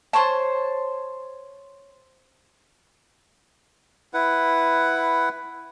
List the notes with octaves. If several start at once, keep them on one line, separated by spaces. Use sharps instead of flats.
C5 C#5 A5
E4 B4 F#5